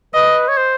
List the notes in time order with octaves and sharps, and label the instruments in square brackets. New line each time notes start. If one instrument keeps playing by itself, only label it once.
[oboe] B4 [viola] D#5
[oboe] C#5
C5